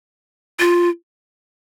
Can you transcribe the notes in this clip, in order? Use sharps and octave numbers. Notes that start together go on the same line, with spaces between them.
F4